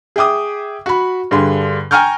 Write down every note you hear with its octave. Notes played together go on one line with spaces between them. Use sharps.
G#4 E5 G5 D6 D#6
F#4 B5
G2 D3 G#4 C6
G5 G#5 A#5 C#6 F6 G6